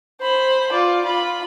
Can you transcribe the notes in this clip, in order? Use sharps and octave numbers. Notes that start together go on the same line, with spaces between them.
C5 B5
F4 D5
F4 B5